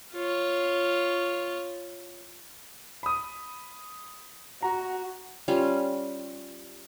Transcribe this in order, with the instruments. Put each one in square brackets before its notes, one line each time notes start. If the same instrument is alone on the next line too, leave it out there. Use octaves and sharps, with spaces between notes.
[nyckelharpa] F4 C#5
[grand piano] B5 D#6
[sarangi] F#4 [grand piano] A#5
[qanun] G3 C#4 F4